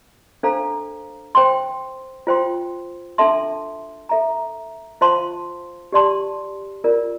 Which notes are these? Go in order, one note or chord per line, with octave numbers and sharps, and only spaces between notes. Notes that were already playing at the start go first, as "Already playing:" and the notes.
D4 A4 C5 F5 A#5
C5 G5 C6
F4 C5 G5 C6
D4 A4 E5 A5 C6
A4 E5 A#5
F4 C5 F5 A5 C6
G4 D5 A5 C6
F4 A#4 D5